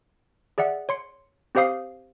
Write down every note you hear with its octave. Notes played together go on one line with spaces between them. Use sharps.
G#4 D5 E5 F#5
C#5 C6 C#7
C4 G4 C5 F5 D#6 C7